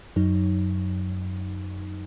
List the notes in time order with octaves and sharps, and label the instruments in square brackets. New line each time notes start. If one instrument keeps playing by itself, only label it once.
[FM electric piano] F#2 F#3 D#4